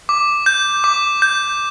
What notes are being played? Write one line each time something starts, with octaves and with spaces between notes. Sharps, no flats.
D6
G6
D6
G6